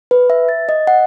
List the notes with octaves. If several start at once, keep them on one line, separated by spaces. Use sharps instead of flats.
B4
E5
A6
D#5
F#5